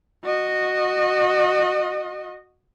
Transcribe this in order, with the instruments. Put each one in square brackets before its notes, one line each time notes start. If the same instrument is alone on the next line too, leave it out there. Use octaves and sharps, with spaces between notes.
[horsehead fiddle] F#4 D#5